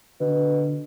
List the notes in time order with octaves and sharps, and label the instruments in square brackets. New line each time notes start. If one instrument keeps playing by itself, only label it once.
[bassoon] B2 [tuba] D3